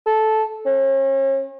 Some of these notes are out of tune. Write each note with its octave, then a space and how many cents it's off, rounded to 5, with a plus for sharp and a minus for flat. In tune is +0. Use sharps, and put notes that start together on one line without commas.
A4 -10
C#4 -40